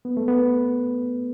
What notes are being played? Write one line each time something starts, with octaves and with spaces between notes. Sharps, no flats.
B3
A3
B3